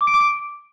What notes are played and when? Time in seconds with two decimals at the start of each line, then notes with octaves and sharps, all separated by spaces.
0.01 D6
0.07 D7
0.14 D6
0.20 D7